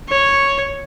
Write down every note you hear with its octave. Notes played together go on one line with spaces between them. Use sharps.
C#5